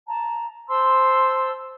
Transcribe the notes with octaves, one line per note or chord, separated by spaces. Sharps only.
A5 A#5
C5 A5 C6 E6